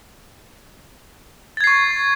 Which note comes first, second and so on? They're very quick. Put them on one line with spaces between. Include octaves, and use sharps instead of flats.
A6 G#6 C7 C#6